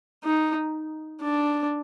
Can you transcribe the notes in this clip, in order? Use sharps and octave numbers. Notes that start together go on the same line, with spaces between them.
D#4
D4